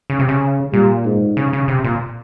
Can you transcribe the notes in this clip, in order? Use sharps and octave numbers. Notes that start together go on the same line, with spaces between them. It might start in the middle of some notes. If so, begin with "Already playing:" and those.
C#3
C3
C#3
A#2 G3
G#2
C#3
C#3
C3
A#2